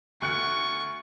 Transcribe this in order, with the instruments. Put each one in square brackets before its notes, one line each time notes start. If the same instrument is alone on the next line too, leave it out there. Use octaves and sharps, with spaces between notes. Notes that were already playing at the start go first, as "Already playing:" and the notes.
[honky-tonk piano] D2 F#6 C#7 [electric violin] C#6